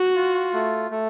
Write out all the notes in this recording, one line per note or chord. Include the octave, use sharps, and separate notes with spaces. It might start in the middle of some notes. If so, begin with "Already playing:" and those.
Already playing: F#4
F4
A3
A3